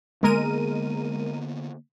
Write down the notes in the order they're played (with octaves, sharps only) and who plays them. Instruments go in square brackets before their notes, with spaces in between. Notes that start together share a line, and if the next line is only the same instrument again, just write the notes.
[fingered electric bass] D3 A#3 B3 [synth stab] G#3 A#4 D#7